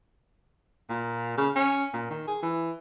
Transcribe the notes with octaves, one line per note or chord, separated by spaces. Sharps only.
A#2
C#3
C#4
A#2
D#3
G#4
E3